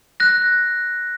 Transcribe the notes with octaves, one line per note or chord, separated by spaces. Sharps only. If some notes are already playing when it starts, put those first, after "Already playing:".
F#6 A#6